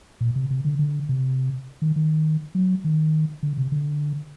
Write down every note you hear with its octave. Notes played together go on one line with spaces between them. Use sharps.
A#2
C3
C3
D3
D3
C3
D#3
D#3
F#3
D#3
D3
C3
D3